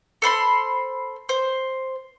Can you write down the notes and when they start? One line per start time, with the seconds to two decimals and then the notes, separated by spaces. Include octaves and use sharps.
0.22 A4 C5 B5 C6
1.29 C5